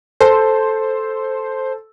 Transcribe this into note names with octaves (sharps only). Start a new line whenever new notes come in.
A4 C5